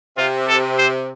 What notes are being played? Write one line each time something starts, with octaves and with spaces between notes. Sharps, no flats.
C3 F4
A4
C5